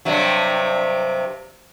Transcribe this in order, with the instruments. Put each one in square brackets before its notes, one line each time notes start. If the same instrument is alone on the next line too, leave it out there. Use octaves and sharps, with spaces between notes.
[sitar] G2 C3 F#3